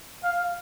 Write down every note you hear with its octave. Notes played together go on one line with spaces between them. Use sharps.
F5